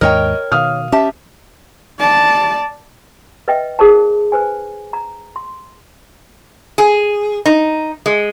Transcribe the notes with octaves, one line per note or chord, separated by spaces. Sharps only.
D#2 G#2 A#4 C#5 D#5 G5
B2 D#3 F5 D#6 F6
C#4 G4 E5 A5
D5 A5
B4 D#5 E5 G5
D#4 G#4 A#4 C5 A5
B4 C5 G#5
A#5
C6
G#4
D#4
G#3